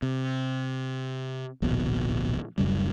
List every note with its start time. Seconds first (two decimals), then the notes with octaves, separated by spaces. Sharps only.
0.02 C3
1.62 D1 A#1 B2
2.58 D1 F#2 C#3 G3